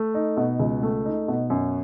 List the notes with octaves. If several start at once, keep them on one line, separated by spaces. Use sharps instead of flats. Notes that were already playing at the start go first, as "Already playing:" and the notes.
Already playing: A3
D#4
B2
C#2
A3
D#4
B2
F#2